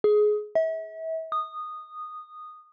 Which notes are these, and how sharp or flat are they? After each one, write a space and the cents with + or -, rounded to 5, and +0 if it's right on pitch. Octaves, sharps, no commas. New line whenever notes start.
G#4 +20
E5 -35
D#6 -15